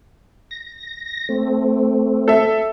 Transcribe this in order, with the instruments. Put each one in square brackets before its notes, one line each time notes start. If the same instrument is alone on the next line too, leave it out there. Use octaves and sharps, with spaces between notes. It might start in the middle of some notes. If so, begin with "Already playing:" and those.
[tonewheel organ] A#6
A3 C4
[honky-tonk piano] A4 E5